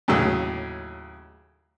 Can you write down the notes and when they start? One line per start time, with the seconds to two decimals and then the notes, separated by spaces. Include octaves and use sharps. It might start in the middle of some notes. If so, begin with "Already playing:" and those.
0.08 D#2 A2 C#3 F#3